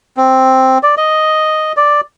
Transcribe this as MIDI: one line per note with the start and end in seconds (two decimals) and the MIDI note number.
0.17 0.78 60
0.83 0.95 74
0.97 1.72 75
1.77 2.01 74